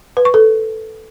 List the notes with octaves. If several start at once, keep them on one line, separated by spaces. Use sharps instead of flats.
B4
C#6
A4